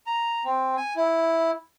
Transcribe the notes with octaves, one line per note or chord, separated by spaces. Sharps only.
A#5
C4
G#5
E4